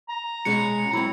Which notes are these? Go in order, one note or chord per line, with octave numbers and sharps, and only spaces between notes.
A#5
B2 G#3 C#4 C#7
F#3 C4 E4